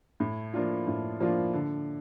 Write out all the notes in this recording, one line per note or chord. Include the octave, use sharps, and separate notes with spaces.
A2
F3 A#3 D4 F4
A2
F3 A#3 D4 F4
D3